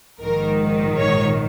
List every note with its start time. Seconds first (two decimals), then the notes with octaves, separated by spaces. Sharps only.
0.22 A#1 G#2 D#3 A#4
0.99 C#5